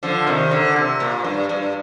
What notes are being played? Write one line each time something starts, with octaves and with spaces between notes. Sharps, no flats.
D3 F3
C3 D#3
D3
C3
A#2
G2
G2